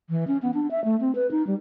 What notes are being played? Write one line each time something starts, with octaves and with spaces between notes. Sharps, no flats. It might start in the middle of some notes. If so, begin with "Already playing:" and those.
E3
C#4
B3
D4
E5
A3
C4
B4
D#4
G3